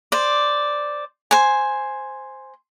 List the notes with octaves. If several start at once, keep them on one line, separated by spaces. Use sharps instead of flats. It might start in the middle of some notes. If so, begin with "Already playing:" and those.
C5 D5
C5 G#5